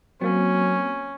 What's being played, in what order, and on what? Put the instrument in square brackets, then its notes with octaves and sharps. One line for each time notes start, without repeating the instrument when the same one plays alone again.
[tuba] F#3 [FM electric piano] A#3 C4 [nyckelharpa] C#4